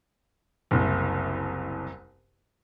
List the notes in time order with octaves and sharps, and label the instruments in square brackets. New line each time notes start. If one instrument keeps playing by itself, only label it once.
[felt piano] F#1 C2